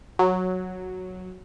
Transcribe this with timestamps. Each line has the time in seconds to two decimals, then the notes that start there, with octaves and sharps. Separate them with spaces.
0.19 F#3